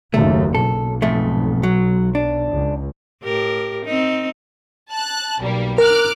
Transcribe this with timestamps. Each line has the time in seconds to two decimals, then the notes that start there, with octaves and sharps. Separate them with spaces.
0.14 F#1 D#2 A3
0.55 B1 A4
1.02 F2 G#2 A3
1.63 F#3
2.15 D4
2.52 C#2
3.23 A2 G4 A#4
3.85 C4 D#4
4.91 A5 F#6
5.41 B1 G3 A#3
5.78 A#4 D6 F6 F#6